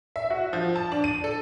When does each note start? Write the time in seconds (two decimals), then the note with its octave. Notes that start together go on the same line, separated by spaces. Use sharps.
0.16 E5
0.30 F#4
0.53 F3
0.76 A5
0.92 D4
1.04 D#7
1.24 A4